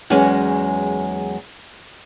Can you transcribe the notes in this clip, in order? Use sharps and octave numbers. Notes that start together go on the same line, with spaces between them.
E2 F#3 G#3 C#4 G#5